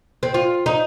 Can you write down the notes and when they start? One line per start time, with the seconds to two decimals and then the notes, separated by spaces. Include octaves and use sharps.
0.23 C4
0.34 F4
0.66 D#4